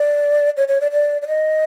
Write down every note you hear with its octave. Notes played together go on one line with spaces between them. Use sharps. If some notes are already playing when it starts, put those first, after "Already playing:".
Already playing: D5
C#5
C#5
D5
D5
D5
D#5